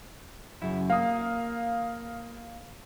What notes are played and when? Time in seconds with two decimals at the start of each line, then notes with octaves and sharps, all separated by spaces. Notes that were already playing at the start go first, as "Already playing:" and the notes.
0.62 F#2 C#3 E4
0.90 A#3 F5 D#6